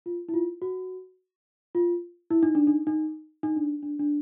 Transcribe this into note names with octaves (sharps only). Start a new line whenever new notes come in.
F4
E4
F4
F#4
F4
E4
D#4
D4
D#4
D#4
D#4
D4
D4
D4